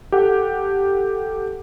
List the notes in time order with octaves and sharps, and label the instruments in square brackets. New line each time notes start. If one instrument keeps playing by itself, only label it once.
[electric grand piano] G4 A4 F#5